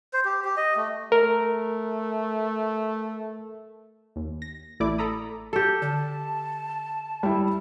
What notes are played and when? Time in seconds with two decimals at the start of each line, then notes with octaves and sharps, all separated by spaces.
0.13 C5
0.25 G4
0.45 G4
0.57 D#5
0.76 A3
1.12 A3 A#4
4.16 D#2
4.42 A#6
4.80 A1 A3 E4 D5 D6
4.98 A4 A#5 B5 D#6
5.53 G4 A4
5.82 D3 A5
7.23 G3 E4